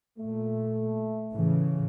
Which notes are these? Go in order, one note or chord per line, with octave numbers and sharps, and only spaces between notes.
A#2 A3
A2 C#3 E3